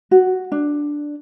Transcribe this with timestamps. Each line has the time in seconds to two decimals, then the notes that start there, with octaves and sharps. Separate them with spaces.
0.11 F#4
0.52 D4